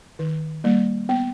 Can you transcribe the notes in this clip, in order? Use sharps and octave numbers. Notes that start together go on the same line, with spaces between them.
D#3
G3 A#3
B3